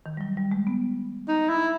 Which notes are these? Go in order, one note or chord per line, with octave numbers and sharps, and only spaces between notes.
D#3
G3
F#3
G3
G#3
B3
D#4
E4